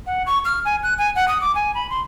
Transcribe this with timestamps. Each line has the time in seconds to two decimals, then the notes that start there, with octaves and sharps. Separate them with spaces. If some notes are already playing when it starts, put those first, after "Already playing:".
0.06 F#5
0.26 C#6
0.45 F6
0.65 G#5
0.83 F#6
0.98 G#5
1.16 F#5
1.28 D#6
1.41 D6
1.55 G#5
1.75 B5
1.90 C6